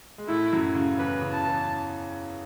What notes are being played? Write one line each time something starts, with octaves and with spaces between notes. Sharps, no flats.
G#3
A2 A3 E4
F#2 F#3
C#3
E2 E3 B4
C#3
A5
E2 E3